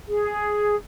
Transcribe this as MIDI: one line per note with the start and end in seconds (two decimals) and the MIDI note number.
0.08 0.75 68